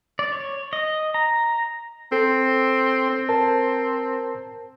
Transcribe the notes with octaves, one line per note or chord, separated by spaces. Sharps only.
D5
C#5
D#5
A#5
C4 A4
C4
A#4 C5 A5